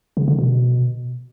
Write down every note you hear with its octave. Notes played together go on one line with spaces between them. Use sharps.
C#3
D3
B2